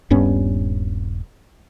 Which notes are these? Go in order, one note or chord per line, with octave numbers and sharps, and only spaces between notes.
D#1 G2 B3 C#4